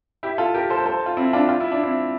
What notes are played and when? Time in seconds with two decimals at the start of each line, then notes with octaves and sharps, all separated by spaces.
0.23 E4 G4
0.38 F4 A4
0.54 G4 A#4
0.70 A4 C5
0.86 A4 C5
1.06 F4
1.17 C4 E4
1.33 D4 F4
1.49 F4
1.60 E4
1.72 D4
1.83 C4 E4